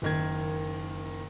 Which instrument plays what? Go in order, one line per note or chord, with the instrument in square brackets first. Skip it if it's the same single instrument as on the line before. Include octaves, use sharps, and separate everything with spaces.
[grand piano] F#1 D#3 G#6